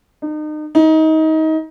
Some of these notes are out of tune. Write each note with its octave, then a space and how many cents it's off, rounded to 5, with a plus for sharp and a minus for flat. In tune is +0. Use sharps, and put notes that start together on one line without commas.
D#4 -35
D#4 +25